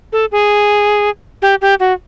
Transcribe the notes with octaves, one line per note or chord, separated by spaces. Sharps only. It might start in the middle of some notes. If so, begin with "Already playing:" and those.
A4
G#4
G4
G4
F#4